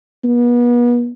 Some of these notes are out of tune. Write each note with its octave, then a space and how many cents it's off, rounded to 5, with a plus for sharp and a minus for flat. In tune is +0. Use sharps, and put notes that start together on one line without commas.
B3 -35